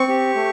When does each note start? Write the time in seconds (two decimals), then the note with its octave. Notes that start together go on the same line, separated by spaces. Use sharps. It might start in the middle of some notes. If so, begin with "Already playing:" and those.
Already playing: C4 C#6
0.09 G4
0.35 A3